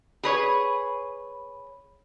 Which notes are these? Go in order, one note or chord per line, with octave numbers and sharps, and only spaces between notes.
G#4 B4 C#5